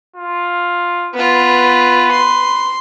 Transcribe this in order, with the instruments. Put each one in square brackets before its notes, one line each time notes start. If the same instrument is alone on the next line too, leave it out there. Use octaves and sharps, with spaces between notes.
[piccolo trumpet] F4
[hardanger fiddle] B3 F4 [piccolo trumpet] B4
[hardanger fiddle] C6